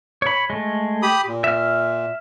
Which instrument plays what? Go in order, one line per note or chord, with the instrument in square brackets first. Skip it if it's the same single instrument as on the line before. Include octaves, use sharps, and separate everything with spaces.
[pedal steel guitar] C#5 B5
G#3 A3
[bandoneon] G4 B5 D#6
A#2
[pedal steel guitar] E5 F6